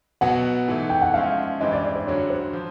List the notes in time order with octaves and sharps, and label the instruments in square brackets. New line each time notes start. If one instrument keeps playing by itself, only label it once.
[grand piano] B2 F#3 B3 [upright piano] F#5
[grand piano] G#2 E3 A3
[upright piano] G5
F#5
[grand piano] F3 G#3 C#4 E4 [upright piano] F5
[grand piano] G2 E3 G#3 C4 [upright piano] D#5
[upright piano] D5
D5
C5
[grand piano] G2 D3 F#3 [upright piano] C#5
[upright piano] C5
[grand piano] F3